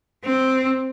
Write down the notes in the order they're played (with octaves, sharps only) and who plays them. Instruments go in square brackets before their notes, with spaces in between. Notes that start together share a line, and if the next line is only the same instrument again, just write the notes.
[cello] C4